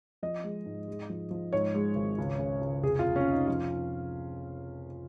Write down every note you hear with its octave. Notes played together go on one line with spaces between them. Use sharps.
F3 D#5
G#3
G#2
G#3
F3
F3
G#2 C#5
G#3
G#1
C#2
C#3
C#2
F1 G#4
F4
F1
C#4
F1
D#4
F3 F4